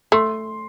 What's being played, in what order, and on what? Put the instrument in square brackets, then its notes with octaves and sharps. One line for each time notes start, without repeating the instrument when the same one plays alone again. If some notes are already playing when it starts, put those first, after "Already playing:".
[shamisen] A3 [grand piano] C6